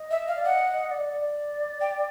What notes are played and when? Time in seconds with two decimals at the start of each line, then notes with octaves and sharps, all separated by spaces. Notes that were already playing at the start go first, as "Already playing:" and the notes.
Already playing: D#5
0.11 E5
0.28 F5
0.36 D5
0.45 D#5 F#5
0.68 D#5
0.91 D5
1.13 D5
1.81 G5